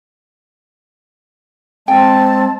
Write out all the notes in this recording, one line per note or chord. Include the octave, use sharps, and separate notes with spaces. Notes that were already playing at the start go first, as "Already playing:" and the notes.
G#3 C4 G5 A5